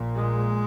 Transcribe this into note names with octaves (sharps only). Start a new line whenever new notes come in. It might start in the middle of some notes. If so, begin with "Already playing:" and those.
Already playing: A#1 A#2
G#3